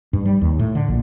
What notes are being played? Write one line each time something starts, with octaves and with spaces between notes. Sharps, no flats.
G2
G3
D#2
A2
D3
A#1